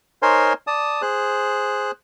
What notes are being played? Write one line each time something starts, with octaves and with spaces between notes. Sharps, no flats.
D#4 A#4 C5 C#5 G#5 C6
D5 A5 D#6
G#4 C5 F#6